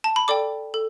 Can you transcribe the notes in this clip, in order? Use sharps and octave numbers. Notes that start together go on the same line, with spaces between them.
A5
B5
A4 D5 G5 D6
A4